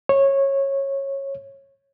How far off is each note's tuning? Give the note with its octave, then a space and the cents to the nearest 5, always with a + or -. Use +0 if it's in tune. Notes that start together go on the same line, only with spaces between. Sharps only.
C#5 -15